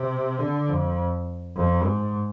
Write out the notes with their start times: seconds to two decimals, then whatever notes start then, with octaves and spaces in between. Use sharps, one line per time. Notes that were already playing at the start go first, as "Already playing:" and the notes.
Already playing: C3
0.39 D3
0.69 F2
1.56 F2
1.84 G#2